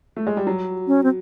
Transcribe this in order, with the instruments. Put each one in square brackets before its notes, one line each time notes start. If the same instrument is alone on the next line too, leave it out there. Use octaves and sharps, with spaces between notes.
[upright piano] A3
G#3
G3
F#3
[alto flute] C#4
C4